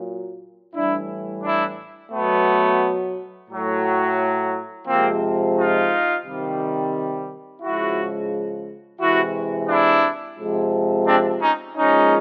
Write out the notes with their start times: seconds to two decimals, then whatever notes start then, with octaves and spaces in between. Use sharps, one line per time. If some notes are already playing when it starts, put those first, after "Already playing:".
Already playing: A#2 F#3
0.74 A2 E3 G3 D4 E4
1.43 D4 E4
2.12 B2 F#3 A3 B3
3.49 A2 F#3
4.88 C3 F3 G#3 A#3 C4
5.57 D#4 F4
6.25 C3 D#3 G3
7.62 C#3 F3 G#3 E4 F#4
9.00 C3 E3 G#3 E4 F#4
9.69 D4 E4
10.38 C3 F3 G#3
11.07 C4 D4
11.41 C#4 D#4
11.76 A#2 F3 G#3 C#4 D#4